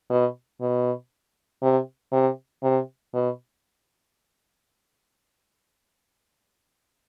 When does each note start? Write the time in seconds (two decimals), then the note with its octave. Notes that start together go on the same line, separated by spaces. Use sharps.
0.10 B2
0.61 B2
1.62 C3
2.12 C3
2.63 C3
3.14 B2